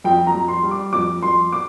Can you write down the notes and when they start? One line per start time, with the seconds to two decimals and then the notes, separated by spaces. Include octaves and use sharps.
0.04 F2 G5
0.27 A#5
0.35 F2
0.48 C6
0.63 G3
0.71 D6
0.93 F2 D6
1.23 F2 C6
1.52 D6